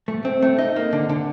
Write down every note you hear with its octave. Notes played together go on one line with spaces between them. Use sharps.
A3
C4
A3
D#4
A#3
D3
D3